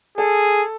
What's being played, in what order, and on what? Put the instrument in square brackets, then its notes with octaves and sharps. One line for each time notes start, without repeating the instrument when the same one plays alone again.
[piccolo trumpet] G#4 [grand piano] A4